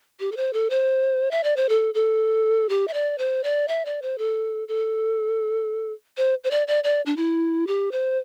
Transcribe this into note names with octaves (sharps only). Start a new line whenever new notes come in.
G4
A4
C5
A4
C5
E5
D5
C5
A4
A4
G4
E5
D5
C5
D5
E5
D5
C5
A4
A4
C5
C5
D5
D5
D5
D4
E4
G4
C5